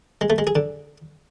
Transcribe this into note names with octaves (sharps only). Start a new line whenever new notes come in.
G#3
A3
G#3
G#4
D3